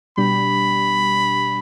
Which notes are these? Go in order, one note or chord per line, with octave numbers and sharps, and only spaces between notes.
B2 G3 D4 G4 B5